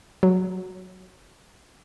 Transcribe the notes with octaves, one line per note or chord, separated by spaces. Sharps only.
F#3